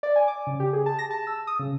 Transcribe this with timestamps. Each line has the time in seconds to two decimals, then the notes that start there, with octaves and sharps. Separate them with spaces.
0.03 D5
0.16 G#5
0.28 D6
0.47 C#3
0.60 G4
0.73 G#4
0.86 A5
0.99 A#6
1.10 A5
1.27 E6
1.47 D#6
1.59 C#3